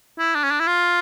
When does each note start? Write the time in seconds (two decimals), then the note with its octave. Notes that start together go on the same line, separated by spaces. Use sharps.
0.19 E4
0.35 D4
0.44 C#4
0.51 D4
0.60 E4
0.67 F4